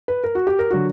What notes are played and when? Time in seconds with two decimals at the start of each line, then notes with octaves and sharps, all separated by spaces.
0.08 B4
0.24 A#4
0.35 F#4
0.47 G4
0.59 A#4
0.70 D3 F#3 F#4